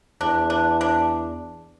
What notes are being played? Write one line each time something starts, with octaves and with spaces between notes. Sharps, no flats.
E2 D4
D4
D4